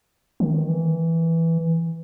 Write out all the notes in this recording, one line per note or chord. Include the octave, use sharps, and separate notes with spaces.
D#3
E3